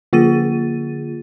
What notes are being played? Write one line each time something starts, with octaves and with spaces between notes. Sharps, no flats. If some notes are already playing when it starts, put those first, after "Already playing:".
D3 A#3 F4 G#4 A6 D#7